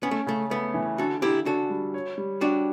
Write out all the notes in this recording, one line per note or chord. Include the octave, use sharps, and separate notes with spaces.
B3 C#4
A3
C#3 A3
A3 B3
E3
D3 F#4 A4
D3 E4 G4
D4 F#4 A4
G3
C#5
G3
D4 F#4 G4